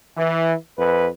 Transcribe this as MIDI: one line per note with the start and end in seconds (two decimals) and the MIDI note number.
0.16 0.53 52
0.78 1.08 41
0.78 1.08 71